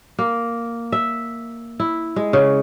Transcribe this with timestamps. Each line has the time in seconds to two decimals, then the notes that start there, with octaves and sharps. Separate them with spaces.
0.19 A#3
0.92 E5
1.80 E4
2.16 G#3
2.33 C#3